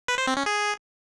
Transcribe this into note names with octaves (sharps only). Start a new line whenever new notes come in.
B4
C5
C4
C#4
G#4